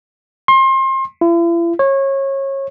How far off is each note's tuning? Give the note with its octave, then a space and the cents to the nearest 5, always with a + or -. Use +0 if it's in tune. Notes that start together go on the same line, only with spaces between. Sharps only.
C6 +30
E4 +45
C#5 -25